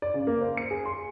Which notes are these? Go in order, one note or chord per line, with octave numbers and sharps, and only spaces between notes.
D5
C#3
A#3
C5
C#7
G#4
C6